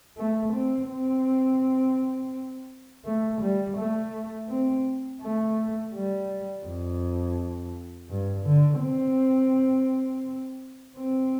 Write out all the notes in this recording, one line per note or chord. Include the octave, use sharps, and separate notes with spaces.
A3
C4
C4
A3
G3
A3
C4
A3
G3
F2
G2
D3
C4
C4